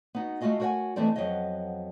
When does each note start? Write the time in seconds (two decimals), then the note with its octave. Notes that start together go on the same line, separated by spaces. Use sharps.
0.15 B3 D#4 F#4
0.41 G#3 A3 F4 F#4 D#5 F5
0.60 F#4 A#4 C#5 D5 F#5 G#5
0.96 D#2 E3 G#3 A3 C4 D5
1.16 F2 F#3 B3 C#5 D#5